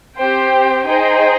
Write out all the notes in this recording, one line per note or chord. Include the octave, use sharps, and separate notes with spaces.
C4 G4 C5 G5
D#4 G#4 C5 D#5 G5